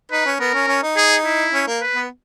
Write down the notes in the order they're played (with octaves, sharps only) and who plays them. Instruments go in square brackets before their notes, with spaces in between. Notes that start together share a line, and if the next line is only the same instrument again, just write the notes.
[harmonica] D#4 [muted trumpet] B4
[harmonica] C#4
[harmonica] B3 [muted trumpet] A#4
[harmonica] C#4
C#4
D#4
[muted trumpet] G#4
E4
[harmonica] C#4
A#3
[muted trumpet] B4
[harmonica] B3